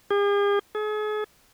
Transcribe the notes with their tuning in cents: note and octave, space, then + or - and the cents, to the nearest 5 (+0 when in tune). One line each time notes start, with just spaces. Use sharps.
G#4 -45
G#4 +40